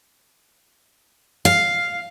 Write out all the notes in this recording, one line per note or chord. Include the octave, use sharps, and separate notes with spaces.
F5